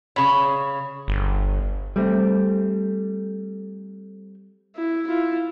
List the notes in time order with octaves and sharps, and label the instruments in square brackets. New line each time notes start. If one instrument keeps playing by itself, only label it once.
[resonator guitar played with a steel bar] C#3 C#5 [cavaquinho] B5
[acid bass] G1
[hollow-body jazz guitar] G3 A3 C4
[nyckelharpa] E4
E4 F4